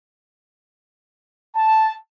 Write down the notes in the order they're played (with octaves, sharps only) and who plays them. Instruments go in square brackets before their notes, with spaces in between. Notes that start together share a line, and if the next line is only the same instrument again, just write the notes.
[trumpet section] A5